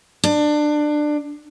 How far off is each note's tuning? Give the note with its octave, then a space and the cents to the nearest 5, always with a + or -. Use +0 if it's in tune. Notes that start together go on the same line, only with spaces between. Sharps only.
D4 +20